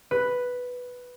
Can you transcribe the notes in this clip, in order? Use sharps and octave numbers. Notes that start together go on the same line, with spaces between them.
B4